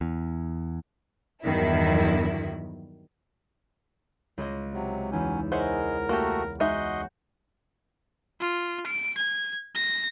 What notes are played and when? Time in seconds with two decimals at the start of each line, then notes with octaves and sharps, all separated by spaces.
0.01 E2
1.42 E2 G2 D#3 F#3 E4
4.38 C#2 G#4 D#5
4.73 C3 F#3
5.12 E2 E3 F#3 C#4 D#4
5.52 G#3 G#4 A#4 C5 C#5 E5 F#5
6.09 A3 A#3 F#4 G4
6.60 G#3 D#4 F#4 D#5 E5 F#5 C6 G6
8.40 F4
8.86 D7
9.17 G#6
9.75 A#6